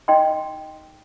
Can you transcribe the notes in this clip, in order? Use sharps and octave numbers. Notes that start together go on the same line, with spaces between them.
D#4 D#5 G5 C6